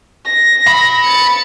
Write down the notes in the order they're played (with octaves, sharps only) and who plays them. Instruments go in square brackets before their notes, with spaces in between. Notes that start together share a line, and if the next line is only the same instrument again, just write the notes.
[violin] A#6
[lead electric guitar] F5 B5
[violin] A6 C#7